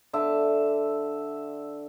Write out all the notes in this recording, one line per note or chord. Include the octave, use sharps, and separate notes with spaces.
D3 E5 A5